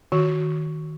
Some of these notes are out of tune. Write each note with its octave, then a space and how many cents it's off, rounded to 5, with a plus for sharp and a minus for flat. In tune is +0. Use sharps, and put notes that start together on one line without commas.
D#3 +0 F#4 +0